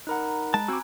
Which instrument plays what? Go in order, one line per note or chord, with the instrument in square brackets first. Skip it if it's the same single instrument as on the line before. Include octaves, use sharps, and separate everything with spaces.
[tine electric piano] D#4 A#4 F#5 [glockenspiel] A#5 B5 F#6
[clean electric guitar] G#3 A5 [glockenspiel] F#6
[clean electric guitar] C4 F#4 [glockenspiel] G#5 G#6 [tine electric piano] D6 E6